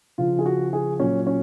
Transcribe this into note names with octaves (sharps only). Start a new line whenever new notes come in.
C#3 F3 F4
G#4
F#4
G#4
A#2 F#3 C#4
C#4